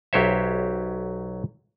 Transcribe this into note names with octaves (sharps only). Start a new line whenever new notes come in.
B1 F#3 G4 C5 C#5 E5